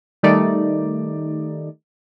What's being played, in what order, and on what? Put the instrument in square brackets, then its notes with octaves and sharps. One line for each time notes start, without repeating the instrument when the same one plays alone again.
[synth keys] D#3 G3 A3 D#4 D5